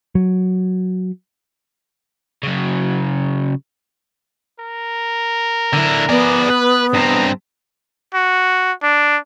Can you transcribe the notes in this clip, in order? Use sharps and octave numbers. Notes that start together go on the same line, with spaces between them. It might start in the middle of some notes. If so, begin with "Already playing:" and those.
F#3
C#3 F#3
A#4
D3 E4
B3 G#4 D5
B4
G2 C4 A#5
F#4
D4